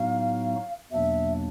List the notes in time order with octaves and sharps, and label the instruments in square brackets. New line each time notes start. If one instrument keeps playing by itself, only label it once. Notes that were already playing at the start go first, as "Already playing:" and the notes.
Already playing: [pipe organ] A2 F#3 B3 D#4 F#4 [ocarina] F5
[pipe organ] E2 B2 F#3 A#3 D4 [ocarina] E5